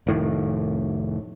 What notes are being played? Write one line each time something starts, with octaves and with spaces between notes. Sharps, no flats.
F1 A2 D#3